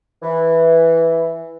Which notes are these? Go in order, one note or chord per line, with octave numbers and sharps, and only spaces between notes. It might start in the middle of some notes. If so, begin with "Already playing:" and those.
E3